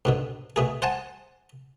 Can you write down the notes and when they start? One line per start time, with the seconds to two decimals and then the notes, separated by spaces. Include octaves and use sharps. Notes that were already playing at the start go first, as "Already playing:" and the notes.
0.05 G#2 B2 D3
0.56 B2 A3 G#4
0.82 C5 F#5 G#5 A5